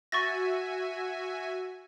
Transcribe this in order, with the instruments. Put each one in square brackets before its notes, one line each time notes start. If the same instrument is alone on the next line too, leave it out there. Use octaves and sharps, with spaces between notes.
[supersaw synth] F#4 E5 G#5 [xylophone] C#6 A6 A#6